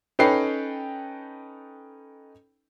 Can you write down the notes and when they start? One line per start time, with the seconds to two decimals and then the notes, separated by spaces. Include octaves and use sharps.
0.19 C#4 D#4 A4 B4 G5 C7